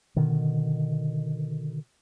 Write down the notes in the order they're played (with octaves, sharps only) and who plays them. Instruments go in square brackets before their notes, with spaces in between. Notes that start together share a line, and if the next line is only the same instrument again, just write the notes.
[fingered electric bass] B2 D3 D#3